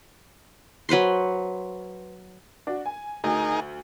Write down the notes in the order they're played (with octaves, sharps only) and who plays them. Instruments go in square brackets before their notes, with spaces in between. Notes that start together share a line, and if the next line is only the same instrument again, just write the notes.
[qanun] F#3 B4 C5 C6
[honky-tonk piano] D4 F#4
G#5
[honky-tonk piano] D2 [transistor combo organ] D#4 G#4 A#4